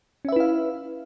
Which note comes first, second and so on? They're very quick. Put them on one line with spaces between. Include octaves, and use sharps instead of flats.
C#4 E5 B4 E4 F5